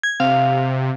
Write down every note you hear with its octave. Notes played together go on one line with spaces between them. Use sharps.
G#6
C3 F5